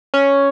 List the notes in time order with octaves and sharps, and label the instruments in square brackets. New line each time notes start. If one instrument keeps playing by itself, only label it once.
[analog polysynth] C#4